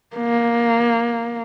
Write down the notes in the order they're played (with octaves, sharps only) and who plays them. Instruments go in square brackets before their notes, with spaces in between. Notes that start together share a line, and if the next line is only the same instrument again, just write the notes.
[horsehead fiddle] A#3